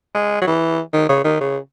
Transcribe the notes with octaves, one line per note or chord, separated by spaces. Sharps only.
G#3
F#3
E3
D#3
C#3
D#3
C#3